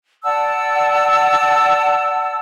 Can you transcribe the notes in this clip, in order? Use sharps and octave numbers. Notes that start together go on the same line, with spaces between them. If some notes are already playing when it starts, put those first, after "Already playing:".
D5 F#5 A5 E6